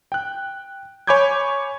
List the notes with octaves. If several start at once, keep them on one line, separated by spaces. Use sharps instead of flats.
G5 F#6
C#5 G#5 B5 D6 G6 G#6